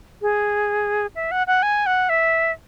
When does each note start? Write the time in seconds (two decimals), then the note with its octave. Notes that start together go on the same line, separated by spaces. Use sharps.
0.22 G#4
1.16 E5
1.31 F#5
1.47 F#5
1.63 G#5
1.86 F#5
2.09 E5